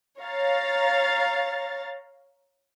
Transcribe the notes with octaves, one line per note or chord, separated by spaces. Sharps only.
C#5 F5 A#5 A6